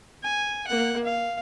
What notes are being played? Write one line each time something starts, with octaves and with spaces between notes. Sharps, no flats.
G#5
A#3 F#5
F5